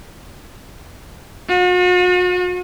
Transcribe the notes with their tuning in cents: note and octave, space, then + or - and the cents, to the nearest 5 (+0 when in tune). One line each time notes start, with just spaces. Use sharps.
F#4 -45